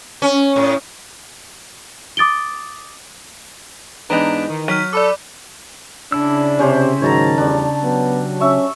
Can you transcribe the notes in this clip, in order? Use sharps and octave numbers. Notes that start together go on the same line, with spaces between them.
C#4
A2
D6 D#6 A6 D7 G7
G#2 E3 B3 D4 D#4 A#5
D#3
F#3 F6 B6 D#7
A4 D5 B5 D6
C#3 D4 E4 E6
C3 C#4 G4 C5
G#2 D#3 F#3 C#5 A5 A#5
E2 A2 G3 D4
F#3 B3
C#4 E5 C#6